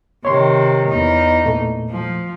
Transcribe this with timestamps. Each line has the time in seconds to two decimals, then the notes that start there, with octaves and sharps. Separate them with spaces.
0.25 C3 D#3 C#5 C6
0.88 E2 D#4
1.45 A#2 A3
1.90 F3